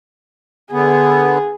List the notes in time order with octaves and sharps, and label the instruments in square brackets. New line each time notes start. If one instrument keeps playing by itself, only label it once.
[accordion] D3 B3 [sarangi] G#4